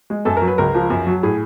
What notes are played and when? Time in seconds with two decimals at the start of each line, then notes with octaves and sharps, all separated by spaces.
0.10 G#3
0.25 F#2 A4
0.37 A#4
0.42 F#3
0.48 B4
0.58 C#2 A#4
0.74 F3
0.90 F#2
1.07 F#3
1.23 A2 G#4